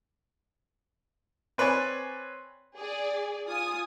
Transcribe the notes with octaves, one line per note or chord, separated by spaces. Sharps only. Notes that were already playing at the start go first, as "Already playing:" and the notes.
C4 B4 C#5 D5 G#5
G#4 D5
F4 G#5 D#6